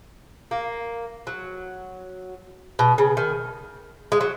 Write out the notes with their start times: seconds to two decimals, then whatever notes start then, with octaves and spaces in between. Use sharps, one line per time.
0.51 A#3
1.27 F#3
2.79 B2
2.98 C#3
3.17 D#3
4.12 G#3
4.21 F#3